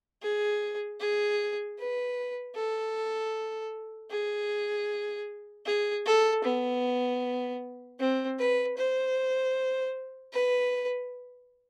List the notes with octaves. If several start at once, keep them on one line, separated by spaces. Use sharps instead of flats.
G#4
G#4
B4
A4
G#4
G#4
A4
B3
C4
B4
C5
B4